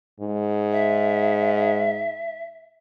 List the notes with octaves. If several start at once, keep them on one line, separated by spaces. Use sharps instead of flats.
G#2
E5